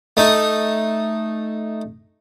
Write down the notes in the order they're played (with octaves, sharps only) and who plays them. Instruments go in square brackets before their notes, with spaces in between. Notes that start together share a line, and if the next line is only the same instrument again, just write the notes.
[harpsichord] A3 D#4